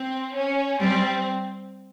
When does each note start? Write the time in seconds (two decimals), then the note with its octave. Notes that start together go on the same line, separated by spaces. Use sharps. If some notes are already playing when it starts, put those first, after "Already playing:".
Already playing: C4
0.36 C#4
0.80 G3 C4